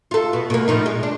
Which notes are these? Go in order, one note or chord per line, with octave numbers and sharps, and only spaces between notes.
F4 A4
B2
B2 A#3
A2 F3 D#4
G#3
D4